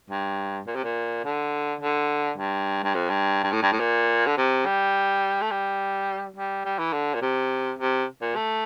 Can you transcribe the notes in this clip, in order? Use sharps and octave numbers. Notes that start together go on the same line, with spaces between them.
G2
A#2
C3
A#2
D3
D3
G2
G2
F2
G2
G2
A2
G2
A2
A#2
D3
C3
G3
A3
G3
G3
G3
E3
D3
A#2
C3
C3
A#2
A3